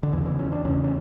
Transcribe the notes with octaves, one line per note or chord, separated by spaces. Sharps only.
D3
E2 C#3 E3
E3
C#4
D4
E2 C#3 C#4
C#4